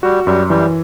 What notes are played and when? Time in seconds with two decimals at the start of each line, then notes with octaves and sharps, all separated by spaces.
0.03 G3 F#4
0.26 F#2 G3
0.50 E3 G3